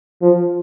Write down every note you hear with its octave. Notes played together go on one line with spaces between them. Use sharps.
F3